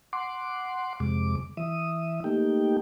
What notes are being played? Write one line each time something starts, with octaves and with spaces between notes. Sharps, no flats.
F#5 C6 D6
F2 C3 G#3 D6
E3 E5 D#6
A3 A#3 D#4 G4 G5